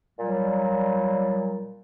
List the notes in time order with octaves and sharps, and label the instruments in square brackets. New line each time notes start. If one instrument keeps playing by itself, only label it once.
[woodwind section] A#2 F#3 G3